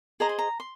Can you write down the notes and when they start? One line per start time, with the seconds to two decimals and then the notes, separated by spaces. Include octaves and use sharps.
0.20 G#4 C5 D#5 A#5
0.29 C6
0.39 A#5
0.60 C6